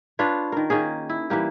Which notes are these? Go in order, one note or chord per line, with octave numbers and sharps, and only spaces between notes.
D4 F4 B4 C#5
D#3 A#4
D#3 A#3 C#4 G#4
E4
E3 G3 A#3 G4